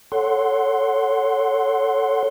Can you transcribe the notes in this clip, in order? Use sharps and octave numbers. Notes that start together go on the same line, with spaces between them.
A4 C#5 F#5 C6